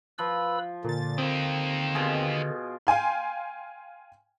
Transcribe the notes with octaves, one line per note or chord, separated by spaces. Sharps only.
F3 B4 B5 E6
A#2 D3 A6
D#3 A#3 C4
B2 F4 G#4
F5 G5 G#5 C6